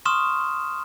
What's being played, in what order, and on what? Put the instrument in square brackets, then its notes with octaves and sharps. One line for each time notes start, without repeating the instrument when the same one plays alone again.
[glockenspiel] C6 C#6 D#6 F6 E7